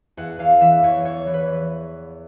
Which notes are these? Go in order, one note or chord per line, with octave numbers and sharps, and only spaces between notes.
E2 F#5
E2 F5
E3 E5
E2 C#5
E2 C#5
E3
B4